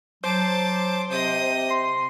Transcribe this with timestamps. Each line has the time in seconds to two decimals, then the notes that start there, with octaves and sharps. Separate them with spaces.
0.24 F#3 C5 A5 D6
1.11 C3 D#5 D#6
1.71 C6